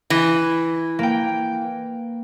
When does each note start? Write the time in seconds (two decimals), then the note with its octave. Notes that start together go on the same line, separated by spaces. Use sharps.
0.10 E3
0.99 A#3 G5